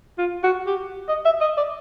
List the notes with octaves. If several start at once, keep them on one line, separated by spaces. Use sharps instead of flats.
F4
F#4
G4
D#5
E5
D#5
D5